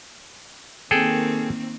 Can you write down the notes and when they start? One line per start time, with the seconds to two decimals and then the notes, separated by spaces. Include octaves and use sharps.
0.91 D#3 A#3 C4 G#4 A4 G5